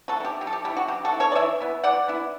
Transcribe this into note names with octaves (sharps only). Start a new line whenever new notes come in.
F#4 A4
A3 E4
G4
F#3 G4
A4
G4
A3 E4 G4
F#4
F#3 G4
F#4 A4
A3 E4
A4 C#5
D5
E3 C#5 E5
B3 E4
E3 D5 F#5
B3 E4